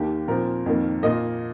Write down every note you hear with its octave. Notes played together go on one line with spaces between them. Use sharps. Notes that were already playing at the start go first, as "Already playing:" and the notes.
Already playing: D#2 D#3 A#3 G4
A#2 F3 C4 A#4
F2 D#3 A#3
A#2 A#3 D#5